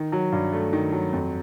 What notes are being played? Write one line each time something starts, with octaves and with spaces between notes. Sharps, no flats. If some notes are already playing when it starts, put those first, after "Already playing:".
Already playing: D#3
F#3
G2
A3
D#3
F#3
F2